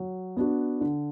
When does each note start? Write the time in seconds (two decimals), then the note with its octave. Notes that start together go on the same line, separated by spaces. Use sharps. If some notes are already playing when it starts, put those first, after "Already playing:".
Already playing: F#3
0.37 B3 D4 F#4
0.81 D3